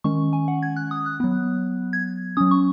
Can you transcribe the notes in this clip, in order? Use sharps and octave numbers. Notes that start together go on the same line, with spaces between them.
D#3 G#3 C#4 C#6
G#5
F#5
G#6
F#6
D#6
F#6
F#3 B3
G#6
F#3 C#4 D#6
C#6